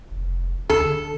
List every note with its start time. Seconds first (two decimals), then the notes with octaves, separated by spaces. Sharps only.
0.11 F1
0.70 D2 A4
0.85 D3